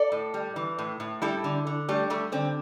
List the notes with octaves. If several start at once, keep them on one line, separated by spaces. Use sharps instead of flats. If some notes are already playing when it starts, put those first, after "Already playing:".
Already playing: A4 D5
A2
G3
E3
A2
A2
G3 E4 A4
D3
D3
G3 A3
G3 A3
D3 C4